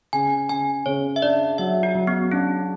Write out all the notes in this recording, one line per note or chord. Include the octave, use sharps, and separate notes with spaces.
C#3 G#5
C#3 G#5
C#3 C#5
E5
D4 D5
F#3 E5
F#4
F#3
B3
C#4 D4